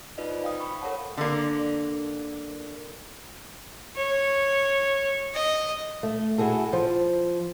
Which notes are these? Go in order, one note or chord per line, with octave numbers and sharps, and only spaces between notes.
D#4 F4 B4 D5 D#5
C5
F5 G5 D#6
B5 C#6
A4 A#4 C#5 F5 F#5 A5
D3 A#3
C#5
D#5
A3
E4 F#4 G#4 A4
F3